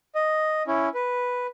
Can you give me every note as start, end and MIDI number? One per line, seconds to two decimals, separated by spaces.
0.15 0.63 75
0.67 0.89 61
0.67 0.89 64
0.94 1.47 71